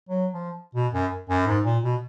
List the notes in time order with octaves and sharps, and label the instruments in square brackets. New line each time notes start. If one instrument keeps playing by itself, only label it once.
[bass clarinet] F#3
F3
B2
F#2
F#2
G#2
A#2
B2